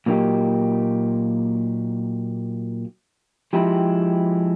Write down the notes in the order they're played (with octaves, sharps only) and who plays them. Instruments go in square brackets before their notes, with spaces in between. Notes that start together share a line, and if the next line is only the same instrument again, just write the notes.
[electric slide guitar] A#2 F#3 A#3 D#4 G4
F3 G#3 C4 E4 G4